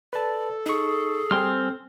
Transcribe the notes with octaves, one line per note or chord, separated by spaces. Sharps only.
A4 B4 D5 A5
D#4 G#4 C#6
G3 C4 G5 G#5 C6 F6